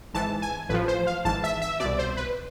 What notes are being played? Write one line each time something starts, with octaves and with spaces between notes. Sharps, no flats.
G#1 G#2 E3 A5
G#5
A1 A2 F3 B4
C5
F5
G#1 G#2 E3 A5
E5
E5
C2 B2 D5
C5
B4